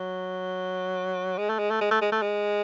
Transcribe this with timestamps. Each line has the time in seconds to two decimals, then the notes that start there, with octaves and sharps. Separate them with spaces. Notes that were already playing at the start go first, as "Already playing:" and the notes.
Already playing: F#3
1.38 G#3
1.49 A3
1.59 G#3
1.71 A3
1.81 G#3
1.91 A3
2.01 G#3
2.12 A3
2.22 G#3